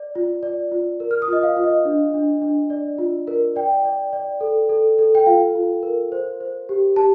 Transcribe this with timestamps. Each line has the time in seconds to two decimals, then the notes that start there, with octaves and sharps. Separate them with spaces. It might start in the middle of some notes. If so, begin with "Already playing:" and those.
Already playing: D5
0.15 F4
0.43 D5
0.72 F4
1.00 A#4
1.11 F6
1.22 D#6
1.28 F4 D#5
1.43 F5
1.57 F4
1.64 D#5
1.85 D4
2.14 D4
2.42 D4
2.70 D5
2.98 F4
3.27 A#4
3.56 D5 G5
3.85 D5
4.13 D5
4.41 A4
4.69 A4
4.99 A4
5.15 G5
5.26 F4 F5
5.55 F4
5.83 A#4
6.12 C5
6.41 C5
6.69 G4
6.96 G4 A5